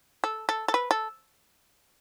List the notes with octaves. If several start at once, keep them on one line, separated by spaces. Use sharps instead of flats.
A4
A4
A4
B4
A4